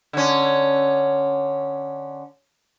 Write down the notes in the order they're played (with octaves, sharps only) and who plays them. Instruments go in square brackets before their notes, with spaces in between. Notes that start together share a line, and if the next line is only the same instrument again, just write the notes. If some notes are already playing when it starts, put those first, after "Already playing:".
[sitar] D3 C#4